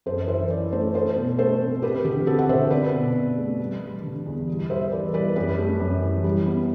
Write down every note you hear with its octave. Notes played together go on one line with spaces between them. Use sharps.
F#2 A4 C5
E3 C5 E5
E3 B4 D5
A3 A4 C5
A3 A4 C5
B2
A3 A4 C5
C4
C4 G4 B4
D3 G4
C4 F#4 A4
F#5
D3 C5 E5
C4 B4 D5
B2
B2
A3
G3
G3
D3
E2
G3
G3 C5 E5
E3 B4 D5
G3 B4 D5
F#2 G4 B4
A3
F#2
E3
G3
B3